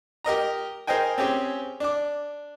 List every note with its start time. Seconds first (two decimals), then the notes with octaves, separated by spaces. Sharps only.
0.25 G4 A#4 D#5 A#5
0.87 G#4 A#4 C5 D#5 G5 G#5
1.18 C4 C#4 G4 G#4
1.80 D4 D6